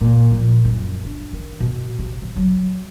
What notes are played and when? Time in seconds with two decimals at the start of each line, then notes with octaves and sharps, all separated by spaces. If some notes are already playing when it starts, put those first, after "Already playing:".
0.01 A#2
0.31 F3
0.65 F#2
1.05 D4
1.33 D#3
1.60 B2
1.99 C3
2.22 F3
2.36 F#3